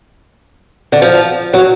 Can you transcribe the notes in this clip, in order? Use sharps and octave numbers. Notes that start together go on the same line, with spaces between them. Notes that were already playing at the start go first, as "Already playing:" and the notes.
D3
F3
F#3